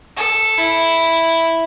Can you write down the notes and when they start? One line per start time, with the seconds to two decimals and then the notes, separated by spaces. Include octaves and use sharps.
0.18 A4
0.58 E4